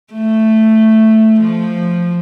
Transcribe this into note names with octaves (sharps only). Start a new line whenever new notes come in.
A3
F3